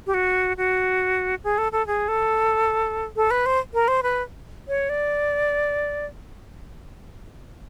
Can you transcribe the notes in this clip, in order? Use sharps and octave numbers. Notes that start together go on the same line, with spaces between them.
G4
F#4
F#4
G#4
A4
A4
G#4
A4
A4
B4
C5
A#4
C5
B4
C#5
D5